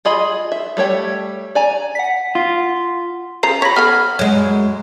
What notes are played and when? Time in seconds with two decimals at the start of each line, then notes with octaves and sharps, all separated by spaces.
0.05 F4 G#4 D#5 B5
0.52 E5
0.77 G3 A3 C#5 G5
1.55 D5 G#5 A#5
1.95 F#5 B6
2.35 F4
3.43 C#3 F3 A#5 C7
3.62 C#5 B5 A#6 B6
3.76 B3 A4 B5 F6
4.19 F#2 G#3 C#5